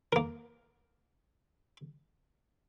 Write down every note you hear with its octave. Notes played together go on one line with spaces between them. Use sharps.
A#3 A#4